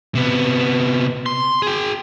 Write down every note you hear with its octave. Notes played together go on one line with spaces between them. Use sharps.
C3 B3
C6
G#4 G5